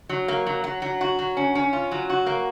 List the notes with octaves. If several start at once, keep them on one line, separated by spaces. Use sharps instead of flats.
F#3
A#3
F#3
F#3
F#3
F#4
F#3
C#4
C#4
F4
F#3
F#4
A#3